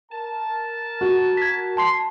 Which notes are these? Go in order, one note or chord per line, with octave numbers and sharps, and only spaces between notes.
A#4 A5
F#4
G#6 B6
A5 C6 C7